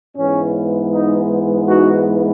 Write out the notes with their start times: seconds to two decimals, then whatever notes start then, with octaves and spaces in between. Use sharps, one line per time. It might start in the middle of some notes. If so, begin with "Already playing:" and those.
0.17 G#2 E3 G#3 B3 C#4
0.92 D#4
1.67 D#4 F#4